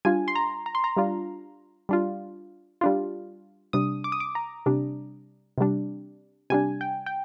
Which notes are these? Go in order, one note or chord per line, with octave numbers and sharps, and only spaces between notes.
G3 D4 F4 G#5
C6
A#5
A#5
C6
A#5
G3 D4 F4
G3 D4 F4
G3 D4 F4
C3 G3 D4 D#6
D6
D#6
D6
A#5
C3 G3 D4
C3 G3 D4
C3 G3 D4 G#5
G5
G5